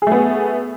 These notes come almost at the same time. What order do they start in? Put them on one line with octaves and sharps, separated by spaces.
G#4 A3 B3